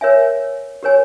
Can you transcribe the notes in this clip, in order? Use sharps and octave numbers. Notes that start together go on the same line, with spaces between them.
A#4 C#5 E5 G#5
G4 A#4 C#5 G#5